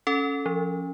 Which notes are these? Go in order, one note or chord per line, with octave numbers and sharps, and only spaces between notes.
C#4 A4
F3